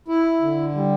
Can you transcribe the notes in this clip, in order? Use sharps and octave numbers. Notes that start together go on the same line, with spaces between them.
E4
D3
G3